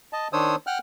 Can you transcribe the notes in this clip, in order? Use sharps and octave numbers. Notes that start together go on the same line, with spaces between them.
D#5 A5
D#3 D4 C5 C#5 D#6 E6
F#5 G5 F6 F#6